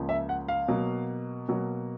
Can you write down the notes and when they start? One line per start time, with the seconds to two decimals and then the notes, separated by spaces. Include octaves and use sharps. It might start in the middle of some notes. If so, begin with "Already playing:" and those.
Already playing: C#2 C#3 F3 A#3
0.09 E5
0.29 F#5
0.48 F5
0.68 B2 F#3 A#3
1.49 B2 F#3 A#3